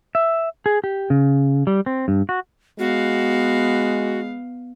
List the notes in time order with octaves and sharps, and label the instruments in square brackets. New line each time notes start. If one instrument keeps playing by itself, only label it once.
[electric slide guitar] E5
G#4
G4
C#3
G3
C4
G2
F#4
[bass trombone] G#3 [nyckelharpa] B3 F5 [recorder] F#4